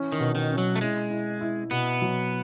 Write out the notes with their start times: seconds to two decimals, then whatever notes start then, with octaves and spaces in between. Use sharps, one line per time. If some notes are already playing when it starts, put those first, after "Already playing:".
Already playing: E3 C#4
0.12 D#3
0.20 B2
0.35 D#3
0.50 C#4
0.58 F#3
0.76 A3
0.81 G#3 E4
1.11 E4
1.41 E4
1.71 B2 B3
2.02 F#3